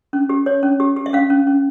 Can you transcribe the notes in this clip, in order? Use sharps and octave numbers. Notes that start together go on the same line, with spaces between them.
C#4
G4
C#5
C#4
G4
G4
E5
C#4 F5
C#4
C#4